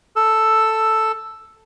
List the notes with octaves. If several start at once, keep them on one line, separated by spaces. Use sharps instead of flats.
A4 E6